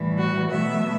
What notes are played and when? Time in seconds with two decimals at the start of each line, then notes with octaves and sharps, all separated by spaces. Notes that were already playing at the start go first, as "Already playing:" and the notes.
Already playing: A2 E3 G3
0.17 F#4
0.50 B2 F#3 A3 E5